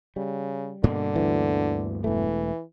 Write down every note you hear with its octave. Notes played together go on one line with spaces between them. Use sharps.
C#3 G3
G2 B2 D3 A#3
D2 E3
E1 E3 A3